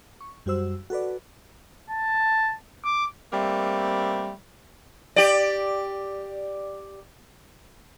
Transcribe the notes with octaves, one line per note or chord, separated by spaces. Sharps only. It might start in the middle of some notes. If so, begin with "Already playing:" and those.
C#6
F#2 G3 F#4 C5 E6
F#4 A4 B4 D5
A5
D6
G3 A3 A#3 C4
G4 D5